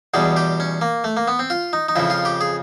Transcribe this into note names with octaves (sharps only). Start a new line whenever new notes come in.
E2 B2 G3 G#4
G4
C#4
A#3
A3
A#3
B3
C4
F4
D#4
D#4
F2 C#3 F3 E4
F4
G4
G#4